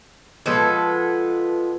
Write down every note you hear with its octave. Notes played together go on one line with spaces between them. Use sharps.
F3 G#3 B3 A4